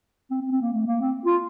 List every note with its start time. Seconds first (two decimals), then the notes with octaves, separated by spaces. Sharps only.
0.31 C4
0.41 C4
0.52 C4
0.62 A#3
0.73 A3
0.87 A#3
1.01 C4
1.26 F4